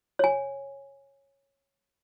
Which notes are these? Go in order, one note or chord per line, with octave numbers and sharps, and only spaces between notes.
C#5 G#5